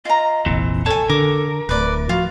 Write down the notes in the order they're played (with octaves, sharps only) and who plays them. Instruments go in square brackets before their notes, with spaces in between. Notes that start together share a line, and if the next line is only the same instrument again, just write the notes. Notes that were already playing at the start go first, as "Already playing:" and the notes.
[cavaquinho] F4 A#5 [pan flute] D#5
[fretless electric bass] F1 A#1 F2 [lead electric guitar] E3 C4
[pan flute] A4 [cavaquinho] C#5 G#5 [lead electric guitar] A5
[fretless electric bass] D3 [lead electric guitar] A#4 [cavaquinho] D6
[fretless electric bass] D1 [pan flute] A3 [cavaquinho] B4 D5
[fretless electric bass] F3 [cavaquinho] F4 [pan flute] F#4